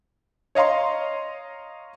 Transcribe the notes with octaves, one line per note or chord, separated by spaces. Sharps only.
C#5 D#5 F5 A#5 C6